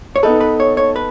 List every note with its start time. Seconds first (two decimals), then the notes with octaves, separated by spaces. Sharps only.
0.16 C#5
0.23 B3 D#4 A4 B4
0.41 B4
0.60 C#5
0.77 C#5
0.96 B4